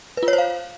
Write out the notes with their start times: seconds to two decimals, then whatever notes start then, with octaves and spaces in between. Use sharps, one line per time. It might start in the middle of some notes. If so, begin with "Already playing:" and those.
0.17 B4
0.23 F4
0.28 C#5
0.33 C5
0.38 F5